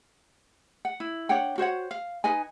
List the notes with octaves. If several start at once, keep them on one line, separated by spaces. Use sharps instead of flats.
F#5
E4
D4 C#5 F#5 G5
F#4 C5 C#5 F#5
F5
D#4 B4 D#5 G#5